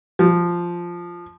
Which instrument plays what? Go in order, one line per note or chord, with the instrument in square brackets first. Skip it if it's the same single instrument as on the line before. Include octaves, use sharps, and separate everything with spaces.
[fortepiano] F3